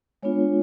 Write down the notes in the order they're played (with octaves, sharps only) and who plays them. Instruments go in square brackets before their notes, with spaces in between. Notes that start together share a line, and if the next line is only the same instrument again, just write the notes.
[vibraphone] G#3 B3 D4 F4 C#5